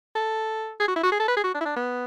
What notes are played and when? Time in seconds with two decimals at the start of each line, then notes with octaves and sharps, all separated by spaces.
0.15 A4
0.80 G#4
0.88 F#4
0.96 E4
1.03 F#4
1.12 G#4
1.20 A4
1.28 B4
1.36 G#4
1.44 F#4
1.54 D4
1.60 E4
1.65 D4
1.76 B3